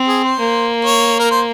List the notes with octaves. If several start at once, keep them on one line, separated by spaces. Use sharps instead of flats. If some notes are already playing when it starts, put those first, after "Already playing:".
Already playing: C4
G#4
C5
A#3
C#5
A#4
C5